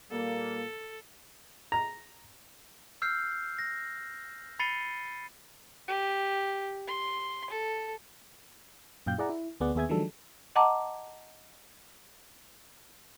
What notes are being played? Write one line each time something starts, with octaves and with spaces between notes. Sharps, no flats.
A#2 G3 A#3 A4
A#5
E6 F6 G6 C7
A#6
B5 A6 C7 C#7 D#7 G7
G4
C6
A4
F#2 A#2 F5 G5 G6
E4 G#4 D5 F#5 A#5
E4
D2 B3 G#4 D5 F#5
D#2 B3 G#4 E5 G#5 G#6
D#3 F3 F#3 G#3 D4 A4
D#5 F#5 A5 A#5 D6